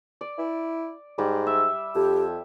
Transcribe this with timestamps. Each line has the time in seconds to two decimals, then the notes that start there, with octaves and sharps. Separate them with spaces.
0.21 D5
0.39 E4
1.18 G#2 G3
1.47 E5
1.95 F2 G4